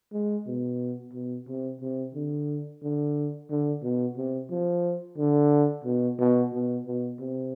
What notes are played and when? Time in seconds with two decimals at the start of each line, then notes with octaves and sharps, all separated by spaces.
0.13 G#3
0.47 B2
1.13 B2
1.48 C3
1.81 C3
2.14 D3
2.82 D3
3.50 D3
3.83 B2
4.17 C3
4.50 F3
5.18 D3
5.84 B2
6.19 B2
6.53 B2
6.86 B2
7.19 C3